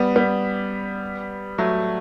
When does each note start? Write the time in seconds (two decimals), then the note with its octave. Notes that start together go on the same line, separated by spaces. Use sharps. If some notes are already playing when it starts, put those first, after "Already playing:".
Already playing: G3 B3
0.16 G3 B3
1.58 F#3 A3